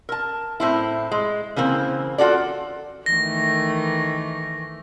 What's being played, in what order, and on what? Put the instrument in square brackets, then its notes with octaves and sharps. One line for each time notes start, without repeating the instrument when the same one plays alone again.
[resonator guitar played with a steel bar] A#4 A5
A2 C4 E4
G#3
C#3 E3 A#3 C4
F4 F#4 A4 D5
[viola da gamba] D#3 E3 A3 [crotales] A#6